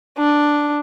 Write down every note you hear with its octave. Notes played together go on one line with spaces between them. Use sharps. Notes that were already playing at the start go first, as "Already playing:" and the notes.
D4